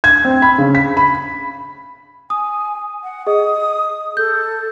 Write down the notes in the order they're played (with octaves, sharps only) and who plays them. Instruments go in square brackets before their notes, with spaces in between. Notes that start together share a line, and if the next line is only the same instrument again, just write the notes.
[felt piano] G#6
C4
B5
C#3
B6
B5
[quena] G#5 [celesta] D#6
[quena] F#5
[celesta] G#4 D#5 [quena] D#6
[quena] A4 [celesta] G6